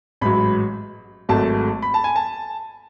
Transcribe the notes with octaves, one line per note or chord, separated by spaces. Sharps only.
A1 G#2 F#3 B5
G#1 G#2 F#3 A3 A5
B5
A5
G#5
A5